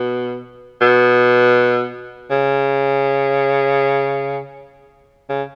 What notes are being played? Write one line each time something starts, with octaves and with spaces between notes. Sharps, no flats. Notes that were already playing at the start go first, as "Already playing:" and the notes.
Already playing: B2
B2
C#3
C#3